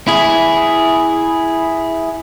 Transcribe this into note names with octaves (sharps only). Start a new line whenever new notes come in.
E4 G#4